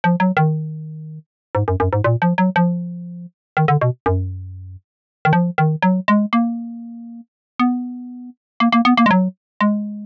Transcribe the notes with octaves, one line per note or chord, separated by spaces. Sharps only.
F3
F#3
D#3
G#2
F#2
F#2
G#2
A#2
F3
F#3
F3
D#3
D3
B2
F#2
D#3
F3
D#3
F#3
G#3
A#3
B3
A#3
A#3
B3
A#3
G#3
F#3
G#3